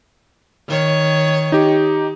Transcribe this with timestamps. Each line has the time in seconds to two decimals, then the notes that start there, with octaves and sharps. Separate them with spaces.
0.68 D#3 C#5
1.52 D#4 G4